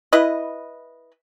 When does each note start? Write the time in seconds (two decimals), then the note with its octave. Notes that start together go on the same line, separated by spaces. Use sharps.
0.13 E4 B4 D#5